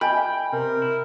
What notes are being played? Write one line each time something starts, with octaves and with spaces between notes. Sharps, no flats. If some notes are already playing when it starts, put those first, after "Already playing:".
D#5 G5 G#5 A#5 B5
C3 A#4
E4